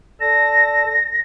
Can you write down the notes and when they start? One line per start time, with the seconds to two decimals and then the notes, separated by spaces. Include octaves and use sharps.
0.20 A4 D5 A5 A#6